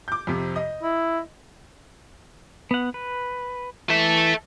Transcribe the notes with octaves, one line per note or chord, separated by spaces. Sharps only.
D6 G6
F2 C3
D#5
E4
B3 F#5
B4
E3 A4 E5